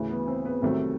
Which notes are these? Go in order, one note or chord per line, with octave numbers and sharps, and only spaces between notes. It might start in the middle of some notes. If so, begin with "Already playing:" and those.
Already playing: D2 C#3 E3
B3
C4
B3
C2 C3 D#3 F#3 A3 C4